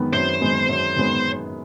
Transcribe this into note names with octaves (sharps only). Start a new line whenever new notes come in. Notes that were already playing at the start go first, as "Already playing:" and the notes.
Already playing: F#2 D#3 G#3 B3
F#2 C5
D#3 G#3 B3
F#2
D#3 G#3 B3